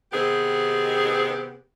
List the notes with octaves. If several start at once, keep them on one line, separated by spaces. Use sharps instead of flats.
C3 D#3 B3 C4 G4 G#4